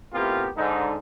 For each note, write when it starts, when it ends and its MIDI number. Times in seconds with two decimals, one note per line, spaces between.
0.14 0.49 45
0.14 0.49 48
0.14 0.49 59
0.14 0.49 65
0.14 0.49 67
0.14 0.49 70
0.57 0.95 44
0.57 0.95 50
0.57 0.95 63